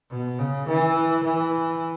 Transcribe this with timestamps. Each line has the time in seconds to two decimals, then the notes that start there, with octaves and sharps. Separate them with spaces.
0.11 B2
0.39 C#3
0.68 E3
1.24 E3